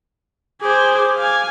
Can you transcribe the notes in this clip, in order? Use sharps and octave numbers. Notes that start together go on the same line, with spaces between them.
G#4 C5 D6
F5 G#5